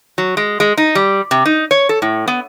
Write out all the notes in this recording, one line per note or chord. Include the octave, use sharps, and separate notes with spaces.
F#3
G#3
G#3
D#4
G3
C3
D#4
C#5
A4
A2
B3